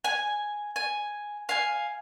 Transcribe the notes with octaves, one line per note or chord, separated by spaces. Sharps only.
G#5
G#5
F5 G#5